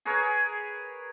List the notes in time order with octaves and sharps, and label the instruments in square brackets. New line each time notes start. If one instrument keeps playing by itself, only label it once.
[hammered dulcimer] G#4 A#4 B4 C#5